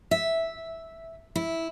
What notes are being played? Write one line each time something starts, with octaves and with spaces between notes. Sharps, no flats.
E5
E4